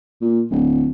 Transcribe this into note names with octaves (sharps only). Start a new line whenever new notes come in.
A#2
D1